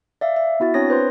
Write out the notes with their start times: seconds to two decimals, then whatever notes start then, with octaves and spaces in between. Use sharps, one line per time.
0.21 D5 E5 F5
0.36 E5
0.60 B3 E4 F#4 A6
0.74 C4 D4 C#5 D#6 A#6
0.90 B4 C5 C6